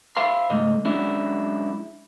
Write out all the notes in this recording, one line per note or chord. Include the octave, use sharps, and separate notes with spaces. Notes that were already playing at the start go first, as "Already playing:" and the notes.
C5 E5 F5 B5 C6
C#2 G#2 A3 D#5
F#3 G#3 C#4 D4 E4